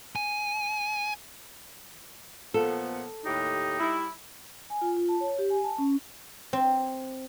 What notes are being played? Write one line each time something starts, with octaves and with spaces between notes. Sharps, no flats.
G#5
A#2 F3 B3 A4
D#2 A2 D#4 G4
G3 E4
G#5
F4
F4
A5
C#5
G4
G#5
A5
C#4
C4